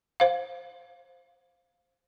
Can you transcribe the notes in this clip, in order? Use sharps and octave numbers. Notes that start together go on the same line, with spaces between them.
C5 F5